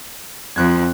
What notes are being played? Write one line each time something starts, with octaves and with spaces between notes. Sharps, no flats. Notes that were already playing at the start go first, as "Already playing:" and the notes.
F2 F3 F#6 G#6